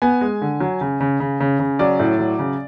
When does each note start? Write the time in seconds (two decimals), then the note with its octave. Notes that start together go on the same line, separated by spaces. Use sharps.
0.02 B3 G#5
0.21 G#3
0.42 D3
0.60 F#3
0.81 C#3
1.00 C#3
1.20 C#3
1.40 C#3
1.60 C#3
1.79 F#3 D5
2.00 A2
2.19 F#3
2.39 C#3